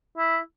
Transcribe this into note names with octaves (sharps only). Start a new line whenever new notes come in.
E4